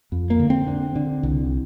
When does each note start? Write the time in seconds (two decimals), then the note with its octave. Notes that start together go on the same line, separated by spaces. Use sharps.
0.12 F2
0.30 A#3
0.40 D3
0.50 C4
0.67 D3
0.96 D3
1.23 C2